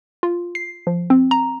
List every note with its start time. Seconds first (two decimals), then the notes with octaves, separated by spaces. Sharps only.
0.23 F4
0.55 C7
0.87 F3
1.10 C4
1.31 A#5